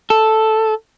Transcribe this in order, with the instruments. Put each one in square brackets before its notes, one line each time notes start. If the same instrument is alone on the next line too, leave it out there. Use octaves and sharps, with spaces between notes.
[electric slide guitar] A4